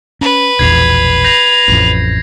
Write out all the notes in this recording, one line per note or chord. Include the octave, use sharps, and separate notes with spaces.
C#4 B4
E1 A#1 E2 G#6 C7 F7
G6 A#6 C7 F7
A1 F2